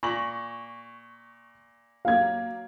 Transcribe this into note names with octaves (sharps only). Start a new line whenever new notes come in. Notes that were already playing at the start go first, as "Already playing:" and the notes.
A#2 C#6 A#6 F#7
F#3 A#3 F5 G#6